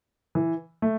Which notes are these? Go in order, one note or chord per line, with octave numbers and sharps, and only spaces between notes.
E3
A3